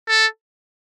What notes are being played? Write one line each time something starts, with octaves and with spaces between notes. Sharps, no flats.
A4